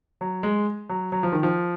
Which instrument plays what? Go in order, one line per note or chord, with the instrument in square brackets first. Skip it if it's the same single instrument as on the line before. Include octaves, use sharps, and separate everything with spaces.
[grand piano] F#3
G#3
F#3
F#3
F3
D#3
F3